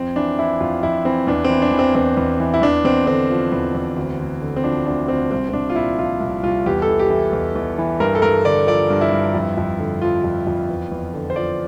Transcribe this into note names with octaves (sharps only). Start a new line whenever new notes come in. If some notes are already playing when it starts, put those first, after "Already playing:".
Already playing: F2 C4
E3 D4
E3 E4
F2 F4
F2 E4
E3 C4
E2 D4
C4
E3
D4
E3
C4
E2 C4
E2
E3
E4
E2 D4
E2 C4
D3 C4
F3
E2
E2
D2
D2
D3
C4
F3 D4
D2 D4
D2 C4
C2 C4
C4
C2 D4
F4
A#2 E4
F3 F4
C2
C2 F4
E2 G4
A4
E3
G4
E3
E2
E2
E3
G2 A#4
A4
G2 A#4
D3 D5
F3 D5
G2
E4
G2
F2
F2
D3
F3 F4
F2
F2
E2
E2
D3
C5
F3 D5